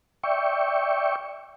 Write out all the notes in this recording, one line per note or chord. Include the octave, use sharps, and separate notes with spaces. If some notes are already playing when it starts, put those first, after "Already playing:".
D5 E5 G5 C#6